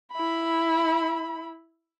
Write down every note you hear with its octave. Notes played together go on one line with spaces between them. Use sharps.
E4 B5